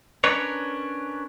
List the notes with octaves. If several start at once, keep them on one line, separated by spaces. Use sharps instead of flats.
C#4 D4 A#4 B4 C#5